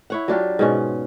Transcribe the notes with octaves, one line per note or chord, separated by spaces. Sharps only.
E4 C#5 F#5
F#3 D4 F4 G4
G#2 B2 C#4